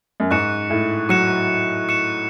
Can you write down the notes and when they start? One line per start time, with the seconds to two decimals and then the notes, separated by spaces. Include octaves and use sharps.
0.20 F#2
0.31 G#2 C#6 F#6 C#7 E7
0.70 A2
1.09 F#3 C#6 F#6 C#7 E7
1.89 C#6 F#6 C#7 E7